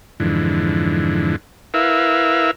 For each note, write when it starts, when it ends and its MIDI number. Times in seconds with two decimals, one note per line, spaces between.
0.20 1.36 41
0.20 1.36 44
0.20 1.36 50
0.20 1.36 52
1.74 2.51 64
1.74 2.51 70
1.74 2.51 71
1.74 2.51 76
1.74 2.51 77